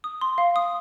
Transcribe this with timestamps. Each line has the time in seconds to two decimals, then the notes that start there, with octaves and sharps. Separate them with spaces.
0.04 D#6
0.21 C6
0.38 F5
0.56 D#6